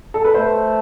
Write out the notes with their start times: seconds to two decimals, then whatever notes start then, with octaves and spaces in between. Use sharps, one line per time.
0.14 A4
0.25 B4
0.34 A3 C5